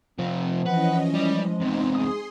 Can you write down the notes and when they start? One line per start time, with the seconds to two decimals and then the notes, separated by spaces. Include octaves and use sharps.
0.19 C3 F3 C4 F4
0.66 E3 C#4 B4 D#5 F#5
1.14 G3 G#3
1.60 E2 C3 C4 D#4
1.95 G#4 C6 D#6